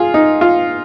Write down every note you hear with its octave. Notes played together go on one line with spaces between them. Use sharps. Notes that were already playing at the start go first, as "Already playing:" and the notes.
Already playing: F4 G#4
D#4
F4